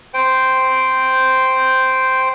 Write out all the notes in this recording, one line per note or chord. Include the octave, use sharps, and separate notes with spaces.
C5 G5